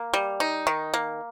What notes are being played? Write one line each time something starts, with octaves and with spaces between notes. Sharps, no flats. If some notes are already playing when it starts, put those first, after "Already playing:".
Already playing: A#3
G3
D#4
D#3
A#3